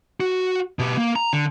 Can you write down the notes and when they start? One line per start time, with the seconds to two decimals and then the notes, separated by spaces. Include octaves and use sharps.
0.20 F#4
0.79 B2 G4
0.98 A#3
1.16 A#5
1.33 D3